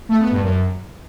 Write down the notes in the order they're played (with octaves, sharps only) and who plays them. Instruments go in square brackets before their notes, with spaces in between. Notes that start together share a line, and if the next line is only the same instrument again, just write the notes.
[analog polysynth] A3
B3
G2
F#2